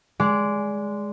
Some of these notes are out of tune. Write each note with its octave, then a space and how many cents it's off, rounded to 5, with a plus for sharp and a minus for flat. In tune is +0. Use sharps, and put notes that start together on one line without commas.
G#3 +0 D5 -15